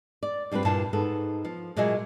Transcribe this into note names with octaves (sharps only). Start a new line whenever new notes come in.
D5
G2 G3 C4 F4 B4
G2 A#2 E4 A5
G#2 B3 A4
F3
A#2 F#3 G#3 D#5 E5 G#5